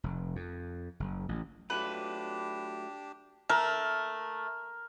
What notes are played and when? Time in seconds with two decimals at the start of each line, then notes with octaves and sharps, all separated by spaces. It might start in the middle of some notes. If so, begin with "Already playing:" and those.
0.04 F1
0.36 F2
1.00 F#1
1.29 A1
1.70 F#3 A3 D4 F4 G4 B4
3.49 A3 A#4